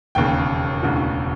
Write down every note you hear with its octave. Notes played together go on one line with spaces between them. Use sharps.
E1 D#2 C#3 G5
E1 D2 C#3 E3